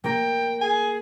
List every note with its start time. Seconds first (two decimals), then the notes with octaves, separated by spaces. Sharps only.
0.04 A#3 A#4 G5
0.61 G#4 G#5